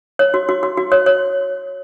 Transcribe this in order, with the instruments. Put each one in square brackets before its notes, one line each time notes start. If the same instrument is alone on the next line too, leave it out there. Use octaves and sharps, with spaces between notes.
[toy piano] C#5
F#4
F#4
F#4
F#4
C#5
C#5